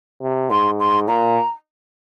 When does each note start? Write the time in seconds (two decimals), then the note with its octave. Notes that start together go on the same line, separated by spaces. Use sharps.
0.22 C3
0.51 G#2 C6
0.80 C6
1.08 A#2 A#5